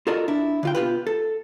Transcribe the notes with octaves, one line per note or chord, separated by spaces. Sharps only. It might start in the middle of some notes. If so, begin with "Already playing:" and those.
F4 F#4 A4 A#4 D5 D#5
D4 E4
D3 F4 G5
B2 F4 G4 B4
A4